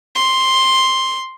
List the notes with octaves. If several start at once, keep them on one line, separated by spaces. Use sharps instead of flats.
C6